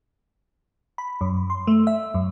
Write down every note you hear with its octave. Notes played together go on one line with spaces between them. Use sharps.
B5
F#2
C6
A3
E5
F#2